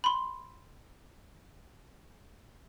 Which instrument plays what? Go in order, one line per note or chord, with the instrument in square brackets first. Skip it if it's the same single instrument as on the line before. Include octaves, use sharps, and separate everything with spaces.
[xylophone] B5 C6